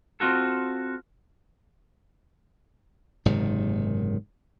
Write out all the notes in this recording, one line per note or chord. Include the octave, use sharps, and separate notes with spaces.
C4 F4 F#4 A4
F#1 G#2 C3 D#3